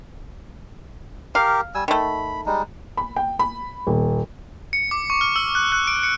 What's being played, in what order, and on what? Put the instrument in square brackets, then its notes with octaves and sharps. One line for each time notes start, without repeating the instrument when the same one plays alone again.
[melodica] G4 A#4 [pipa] F5
[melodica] G3 G#5 E6
[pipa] D#3 A3 [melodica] B5
[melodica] G3 G#3 D#4
[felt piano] B5
G5
B5
D#1
[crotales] C#7
D6
C#6
F6
E6
F#6
F#6
D7
C#7